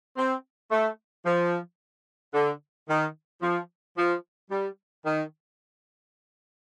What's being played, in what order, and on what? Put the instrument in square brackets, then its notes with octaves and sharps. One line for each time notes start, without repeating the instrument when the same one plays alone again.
[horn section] C4
A3
F3
D3
D#3
F3
F3
G3
D#3